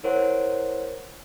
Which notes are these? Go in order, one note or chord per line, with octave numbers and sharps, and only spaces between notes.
E4 A#4 C5 C#5 F#5